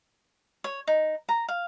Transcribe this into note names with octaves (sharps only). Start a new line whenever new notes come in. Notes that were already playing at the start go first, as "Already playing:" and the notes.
C#5
D#4
A#5
F5